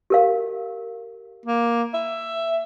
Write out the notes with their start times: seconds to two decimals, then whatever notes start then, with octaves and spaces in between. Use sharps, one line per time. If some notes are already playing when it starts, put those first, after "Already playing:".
0.10 G4 A#4 F5
1.46 A#3
1.94 E5